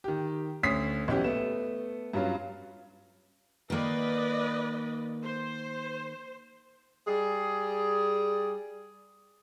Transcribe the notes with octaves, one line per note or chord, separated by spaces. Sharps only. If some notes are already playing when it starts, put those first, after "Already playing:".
D#3 G4
D2 C#4 C#5 D#6 B6 C7
B1 E3 C#4 G4
A3 B3 E7
G2 F#3 C#4 F4
D#3 A#3 B4 D5 D#5
C5
G3 G#4